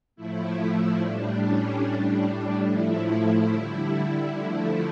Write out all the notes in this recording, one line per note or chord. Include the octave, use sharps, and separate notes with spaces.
A2 F3 A3 E4
A2 G3 D4
C#4
A2 G3 D4
A2 F3 A3 E4
D3 G3
D3 F3 A3 E4